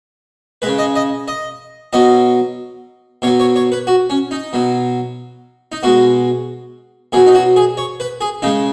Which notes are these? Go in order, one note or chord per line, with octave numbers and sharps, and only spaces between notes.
C#3 G#3 B4
D#5
D#5
D#5
B2 F#3 D#5
B2 F#3 C#5
C#5
C#5
B4
F#4
C#4
D#4
B2 F#3
D#4
B2 G#3 F#4
B2 F#3 G#4
D#4
F#4
G#4
C#5
B4
G#4
C#3 G#3 D#4